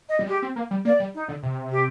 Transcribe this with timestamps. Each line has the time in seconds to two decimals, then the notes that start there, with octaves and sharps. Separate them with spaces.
0.09 D#5
0.19 G3
0.27 G#3 G4
0.42 C4
0.56 A#3
0.71 G3
0.85 A#3 D5
1.00 G3
1.14 D#4
1.28 D3
1.43 C3
1.71 G4